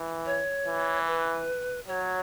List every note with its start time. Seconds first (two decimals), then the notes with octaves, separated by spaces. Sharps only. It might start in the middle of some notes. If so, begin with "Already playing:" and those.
Already playing: E3
0.26 C#5
0.66 E3
1.07 B4
1.88 F#3 C#5